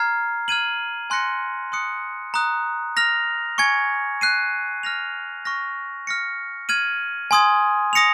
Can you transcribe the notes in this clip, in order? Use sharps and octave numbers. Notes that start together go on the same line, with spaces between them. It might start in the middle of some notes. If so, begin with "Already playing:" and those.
Already playing: A#5 F6 G#6 C7
F6 G#6 D#7 F#7
G#5 C6 F#6 A#6 C#7
C6 D#6 F#6 C#7
A#5 D#6 F#6
F6 A#6 F7
G#5 C#6 G#6 C#7
F#6 C7 D#7
F6 A#6 F7
C#6 F6 A#6
F6 A#6 C#7
F6 G#6 D#7 F#7
G#5 C6 D#6 G#6
D#6 A#6 C#7 F7